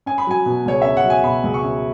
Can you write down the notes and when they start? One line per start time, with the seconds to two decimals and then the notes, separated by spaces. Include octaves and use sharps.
0.06 C#4 G#5
0.18 B5
0.27 F#3 G#5
0.46 B2
0.66 C#2 C#5
0.82 C#4 E5
0.97 F#5
1.04 F#3
1.10 G#5
1.24 B2 B5
1.44 C#2
1.54 C#6
1.64 C#4